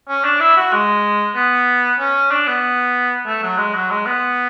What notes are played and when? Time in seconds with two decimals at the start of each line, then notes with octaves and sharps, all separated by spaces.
0.09 C#4
0.24 D4
0.40 E4
0.57 F#4
0.73 G#3
1.36 B3
1.99 C#4
2.31 D4
2.48 B3
3.26 A3
3.43 F#3
3.58 G#3
3.74 F#3
3.91 G#3
4.06 B3